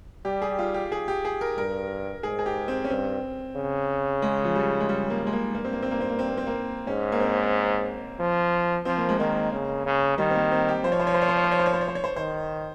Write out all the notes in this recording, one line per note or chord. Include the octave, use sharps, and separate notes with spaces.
G3 G4
G#4
F4
G4
G#4
G4
G#4
A#4
G2 A#4
G#2 G#4
G#4
G4
C4
C#4
G2 C4
C#3
G#3
F3
G3
G#3
G3
A#3
G#3
A#3
G2 A#3
C4
A#3
C4
A#3
C4
A#3
C4
A#3
C4
A#3
G#2 C#4
A#3
C4
F3
F3 C4
A#3
G#3
D#3 A#3
C#3
C#3
D#3 G3
C4
A#3
C4
G4
F3 C5
C#5
C5
C#5
C5
C#5
C5
C#5
C5
C#5
C5
C#5
C5
C#5
C5
C#5
C5
D#3 C5